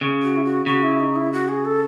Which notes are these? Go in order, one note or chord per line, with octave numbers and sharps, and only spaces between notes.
C#3
F#4
E4
F#4
C#3 F#4
E4
D#4
E4
F#4
G#4
A4